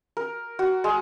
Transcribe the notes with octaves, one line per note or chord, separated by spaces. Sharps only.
A#4
F#4
G#3